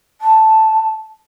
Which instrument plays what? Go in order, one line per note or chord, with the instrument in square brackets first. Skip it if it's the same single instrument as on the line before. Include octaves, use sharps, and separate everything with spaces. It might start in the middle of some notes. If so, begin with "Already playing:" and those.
[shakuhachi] A5